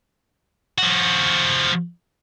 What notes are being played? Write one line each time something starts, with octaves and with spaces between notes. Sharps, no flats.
F3 F#4